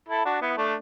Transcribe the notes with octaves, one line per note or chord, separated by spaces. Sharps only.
E4 A4
D4 F#4
B3 E4
A3 D4